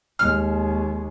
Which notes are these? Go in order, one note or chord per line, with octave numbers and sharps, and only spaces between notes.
D#2 G#3 F6